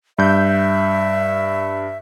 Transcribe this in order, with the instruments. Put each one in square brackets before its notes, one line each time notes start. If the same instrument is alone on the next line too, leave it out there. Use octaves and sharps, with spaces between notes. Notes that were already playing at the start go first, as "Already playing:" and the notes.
[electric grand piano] G2 G6 [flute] E5